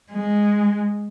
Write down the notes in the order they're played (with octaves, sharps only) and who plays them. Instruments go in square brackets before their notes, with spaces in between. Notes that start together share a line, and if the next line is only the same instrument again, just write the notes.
[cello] G#3